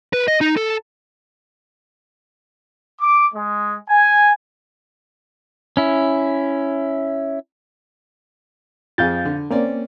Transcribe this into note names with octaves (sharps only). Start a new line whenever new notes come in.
B4
D#5
D#4
A4
D6
G#3
G#5
C#4 E4
F2 G#4 F5 G6 A6
D3
A#3 C4 C#4 D5